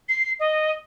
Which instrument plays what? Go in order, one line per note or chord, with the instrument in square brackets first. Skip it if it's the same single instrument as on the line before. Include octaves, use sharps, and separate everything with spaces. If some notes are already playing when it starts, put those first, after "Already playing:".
[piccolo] C7
D#5